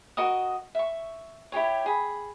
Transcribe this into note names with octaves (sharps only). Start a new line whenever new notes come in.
F#4 A#4 D#5 D#6
E5 C#6
E4 G4 G#4 C#5
G#4 B5